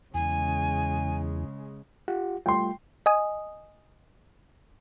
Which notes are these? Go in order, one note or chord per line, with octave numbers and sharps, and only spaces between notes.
E2 C#3 G#3 G#5
F4 G4 F#5
G3 A3 F4 G5 C6
D#5 G#5 D#6